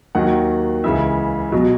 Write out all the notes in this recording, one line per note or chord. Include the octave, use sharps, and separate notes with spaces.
D#2 D#3 F#3 F#5
C#2 C#3 E3 E5
B2 F#3